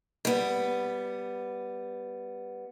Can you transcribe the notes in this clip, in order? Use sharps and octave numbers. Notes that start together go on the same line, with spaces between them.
G3 B3